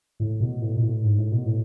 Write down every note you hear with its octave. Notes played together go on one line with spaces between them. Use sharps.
A2
B2
A2
B2
A2
G#2
A2
B2
A2